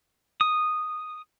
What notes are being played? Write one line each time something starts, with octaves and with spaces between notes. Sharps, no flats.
D#6